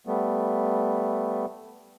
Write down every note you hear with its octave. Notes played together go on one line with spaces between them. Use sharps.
G3 A3 B3